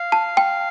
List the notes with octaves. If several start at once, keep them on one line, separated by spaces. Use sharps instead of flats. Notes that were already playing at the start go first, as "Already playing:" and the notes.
Already playing: F5
A5
G5